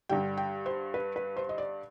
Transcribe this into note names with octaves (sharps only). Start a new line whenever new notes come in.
G2 D3 G3 G5
G5
C5
B4
B4
C5
D#5
D5